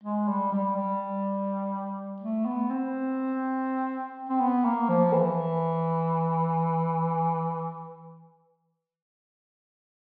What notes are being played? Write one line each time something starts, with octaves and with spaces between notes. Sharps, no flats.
G#3
G3
G3
G3
A3
B3
C4
C4
B3
A#3
F3
E3